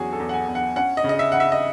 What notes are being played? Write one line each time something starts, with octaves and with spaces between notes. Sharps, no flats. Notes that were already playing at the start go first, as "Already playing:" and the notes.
Already playing: E2 F#3 C#4 F#4 G#4
A4
E2
F#5
G#5
E2
F#5
C#4 F#5
D#5
C#3
D#5
E5
C#3 F#5
E5
D#5